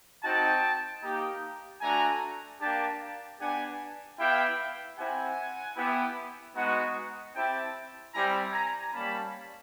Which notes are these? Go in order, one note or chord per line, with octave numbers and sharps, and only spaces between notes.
C4 D#4 F#4 G5 A5
A#3 D#4 G4
A3 D4 F#4 G#5 A#5
A#3 D4 G4 G5 A5
B3 D4 G4 F#5 G#5
B3 E4 G4 F5 G5
C4 E4 G4 F#5 G#5
B3 E4 G4
G#3 B3 D#4 F#4
C4 E4 G4 G5 A5
G3 C4 E4 G4 G#5 A#5
G#5 A#5
G3 A#3 C#4 A5 B5